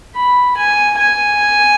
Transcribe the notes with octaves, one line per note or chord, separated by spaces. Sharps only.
B5
G#5
G#5